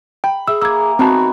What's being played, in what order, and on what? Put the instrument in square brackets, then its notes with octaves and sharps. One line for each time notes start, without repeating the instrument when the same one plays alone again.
[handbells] G5 [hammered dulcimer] B5
[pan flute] G#4 [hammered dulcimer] E5 [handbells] E6
[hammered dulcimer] A#3 G#5 D6 [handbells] E6 G#6
[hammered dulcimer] D#3 B3 [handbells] C4 A5 [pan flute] F#4